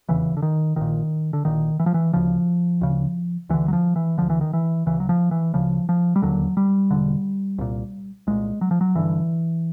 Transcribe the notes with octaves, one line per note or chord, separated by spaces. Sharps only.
F1 E2 C#3 E3
D3
D#3
A#1 A#2 D#3
D3
A#1 A#2 D#3
E3
F3
E3
D2 C#3 F3
D2 C#3
D2 D3 E3
F#3
F3
E3
D2 D3 F3
E3
D#3
E3
D2 C#3 E3
F#3
F3
E3
D2 C#3 F3
F3
G3
E1 D#2 D3 F#3
G3
E1 D#2 D3
C2 A#2
C2 A#2 G#3
F#3
F3
F#3
G1 G2 D3 E3